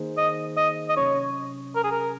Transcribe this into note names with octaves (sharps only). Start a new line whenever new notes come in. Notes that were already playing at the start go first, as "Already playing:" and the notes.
Already playing: D#3 A#3 D#4 G#4 C5
D#5
D#5
D#5
C3 F#3 C#4 C#5
A#4
G#4
A#4